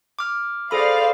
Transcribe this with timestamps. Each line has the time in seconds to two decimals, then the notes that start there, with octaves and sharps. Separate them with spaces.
0.19 D6 F6
0.71 G#4 A4 C5 D5 F5 B5